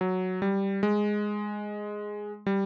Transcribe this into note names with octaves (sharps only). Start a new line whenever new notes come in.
F#3
G3
G#3
G3